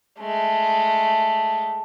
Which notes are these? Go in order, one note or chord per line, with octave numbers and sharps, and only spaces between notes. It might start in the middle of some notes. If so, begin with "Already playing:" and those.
G#3 A3